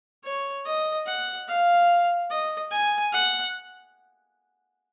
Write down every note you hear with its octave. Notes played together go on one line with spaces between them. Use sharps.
C#5
D#5
F#5
F5
D#5
G#5
F#5